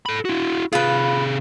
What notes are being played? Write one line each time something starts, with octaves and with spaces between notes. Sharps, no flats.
A4 B5
E4 F#4
C3 F4 G#4 B4